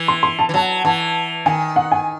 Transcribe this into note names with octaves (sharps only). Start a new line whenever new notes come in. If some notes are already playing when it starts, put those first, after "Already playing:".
Already playing: E3
C6
C6
A5
E3
F#3 A5
E3 A5
D#3 G#5
F#5
G#5